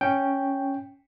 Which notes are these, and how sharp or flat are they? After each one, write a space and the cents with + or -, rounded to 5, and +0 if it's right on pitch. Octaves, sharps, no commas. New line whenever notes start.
C#4 +0 G5 +0